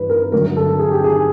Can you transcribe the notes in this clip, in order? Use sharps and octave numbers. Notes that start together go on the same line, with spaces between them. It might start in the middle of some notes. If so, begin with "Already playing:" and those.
Already playing: G2 E3 B4
A#4
G2 D3 F#3 A3 A#4
A4
G#4
G4
G#4